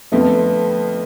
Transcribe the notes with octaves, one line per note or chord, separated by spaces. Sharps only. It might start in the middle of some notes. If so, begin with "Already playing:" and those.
F2 D3 F3 A3 B3